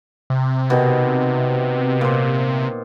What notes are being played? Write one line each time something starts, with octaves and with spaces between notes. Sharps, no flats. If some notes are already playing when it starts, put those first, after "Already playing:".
C3
B2 D#3 D#4
A#2 C5